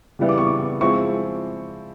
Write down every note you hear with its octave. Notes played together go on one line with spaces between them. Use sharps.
C#3 E3 G3 B3 E4
D6
C#6
D6
F3 G#3 C4 E4 C#6